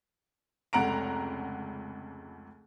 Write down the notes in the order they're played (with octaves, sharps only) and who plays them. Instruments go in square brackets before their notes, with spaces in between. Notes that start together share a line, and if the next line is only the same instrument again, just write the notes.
[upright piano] F1 C#2 F#5 A#5 D7